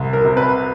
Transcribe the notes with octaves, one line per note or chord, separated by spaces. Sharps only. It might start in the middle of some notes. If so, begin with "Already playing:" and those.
Already playing: C2
A#4
C3
B4